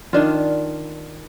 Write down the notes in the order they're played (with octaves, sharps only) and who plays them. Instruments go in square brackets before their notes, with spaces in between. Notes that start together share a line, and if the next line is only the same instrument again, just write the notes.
[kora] D#3 D4 F4